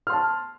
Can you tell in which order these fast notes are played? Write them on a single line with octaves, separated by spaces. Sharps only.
F6 C6 A5